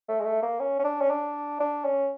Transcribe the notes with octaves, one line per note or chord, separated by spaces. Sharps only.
A3
G#3
A3
A#3
C#4
C#4
D4
C#4
D4
D4
C#4